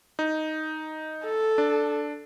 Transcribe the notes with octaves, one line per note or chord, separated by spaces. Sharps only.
D#4
A4
D4